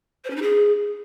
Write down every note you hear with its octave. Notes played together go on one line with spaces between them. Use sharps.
C5
C#4
D#4
G#4